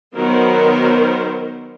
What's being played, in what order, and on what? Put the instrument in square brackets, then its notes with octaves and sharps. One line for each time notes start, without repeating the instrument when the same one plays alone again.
[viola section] D#3 F#3 B3 A#4 C5